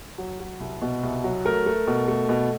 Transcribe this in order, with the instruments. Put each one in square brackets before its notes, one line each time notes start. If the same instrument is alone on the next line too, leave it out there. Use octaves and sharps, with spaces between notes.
[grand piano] F#3
F#3
C2
B2
C2
F#3
A3 A#4
A3
B2
A3
B2